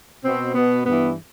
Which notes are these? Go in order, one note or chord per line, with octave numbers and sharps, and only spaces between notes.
B2 C4
B2 B3
G2 E3 B3